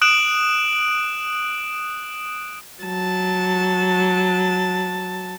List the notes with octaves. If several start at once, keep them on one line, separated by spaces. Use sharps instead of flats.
D#6 F#6 D7 E7 F#7
F#3 A5